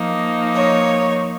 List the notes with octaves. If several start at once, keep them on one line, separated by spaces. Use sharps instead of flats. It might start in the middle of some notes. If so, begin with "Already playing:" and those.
Already playing: F3 A#3 D#4
C#5